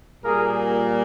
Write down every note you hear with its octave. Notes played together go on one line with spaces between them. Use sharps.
A#2 G3 A#3 G#4 A#4